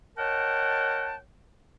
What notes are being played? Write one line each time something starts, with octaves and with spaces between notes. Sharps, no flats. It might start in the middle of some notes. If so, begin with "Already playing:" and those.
A#4 C#5 D#5 F#5 G5 A5